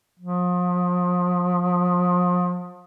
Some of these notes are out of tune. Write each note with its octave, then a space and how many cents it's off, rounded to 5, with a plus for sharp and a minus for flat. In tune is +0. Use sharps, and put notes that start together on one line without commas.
F3 +35